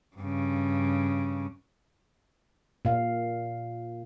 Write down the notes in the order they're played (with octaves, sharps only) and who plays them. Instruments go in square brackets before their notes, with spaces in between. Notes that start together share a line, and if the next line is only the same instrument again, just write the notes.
[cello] G2 C#3
[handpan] A#2 F5